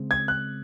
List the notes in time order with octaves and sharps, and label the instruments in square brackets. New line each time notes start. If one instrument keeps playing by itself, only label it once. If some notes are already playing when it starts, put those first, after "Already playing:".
Already playing: [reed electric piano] C#3 G#3 C4
[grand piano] G#6
F#6